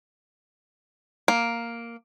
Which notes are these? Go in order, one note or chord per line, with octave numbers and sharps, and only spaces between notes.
A#3